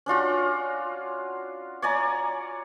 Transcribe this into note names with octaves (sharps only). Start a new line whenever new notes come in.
C#4 D4 F4 F#4
C#5 D5 G#5 A#5